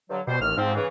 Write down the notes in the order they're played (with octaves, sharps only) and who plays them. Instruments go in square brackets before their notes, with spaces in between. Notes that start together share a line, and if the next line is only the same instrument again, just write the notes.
[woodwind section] G2 D3 F#3
[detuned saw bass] B2 [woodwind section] G3 C5
[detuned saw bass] A1 [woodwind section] D#2 F6
[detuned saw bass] G#2 [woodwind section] F3 C4
[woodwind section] C#3 E3